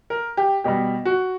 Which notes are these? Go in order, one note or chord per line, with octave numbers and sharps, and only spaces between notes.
A#4
G4
B2 G3 G4
F#4